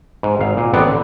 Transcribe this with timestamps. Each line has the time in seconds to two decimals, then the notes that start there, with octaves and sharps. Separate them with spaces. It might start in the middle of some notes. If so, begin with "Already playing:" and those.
0.23 G#2
0.39 G#1 F5
0.57 A#2
0.73 A1 B3 C4 D5 F#5
0.87 D3